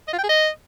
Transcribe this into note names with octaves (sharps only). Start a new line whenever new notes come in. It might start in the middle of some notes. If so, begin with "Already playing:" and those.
D#5
F4
G5
G#4
D#5